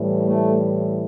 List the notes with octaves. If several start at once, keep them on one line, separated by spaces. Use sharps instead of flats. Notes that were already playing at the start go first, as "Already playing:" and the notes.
Already playing: A2 E3 G3
A3